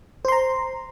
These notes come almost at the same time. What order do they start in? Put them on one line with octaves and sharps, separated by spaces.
C5 C6 A#5